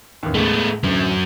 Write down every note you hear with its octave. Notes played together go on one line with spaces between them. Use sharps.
A1 D#2
A2 G#3 A3 B3
A1 D2 F#3 C#4